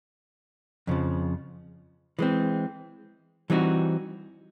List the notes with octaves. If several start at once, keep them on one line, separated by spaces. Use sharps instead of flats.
F2 C#3 F3
E3 G#3 C4
E3 G3 C4 D#4 F#4